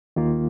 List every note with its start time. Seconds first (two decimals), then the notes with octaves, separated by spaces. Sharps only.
0.16 D#2 D#3 A#3 F4